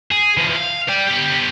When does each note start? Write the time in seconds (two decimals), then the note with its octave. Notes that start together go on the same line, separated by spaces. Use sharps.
0.12 G#4
0.37 E3 F3
0.56 F5
0.89 D5 G5
1.07 B3 G4